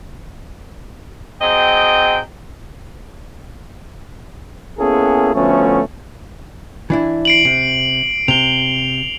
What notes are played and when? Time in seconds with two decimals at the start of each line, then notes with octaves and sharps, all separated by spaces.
1.42 F#3 C4 G#4 D#5 G5
4.79 A#3 B3 C#4 E4 G#4 A4
5.35 D2 F3 A3 B3 C#4
6.90 E3 D4 E4
7.25 C7 D7 F#7
7.45 C3 C7
8.28 C3 F7 G7